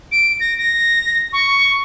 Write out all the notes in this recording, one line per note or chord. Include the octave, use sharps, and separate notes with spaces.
D7
A#6
A#6
C#6